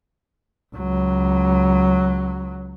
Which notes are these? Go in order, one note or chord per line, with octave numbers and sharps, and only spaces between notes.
C#2 F#3